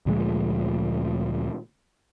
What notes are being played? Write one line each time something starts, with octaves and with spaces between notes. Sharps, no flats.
D2 A#2 F3 G#3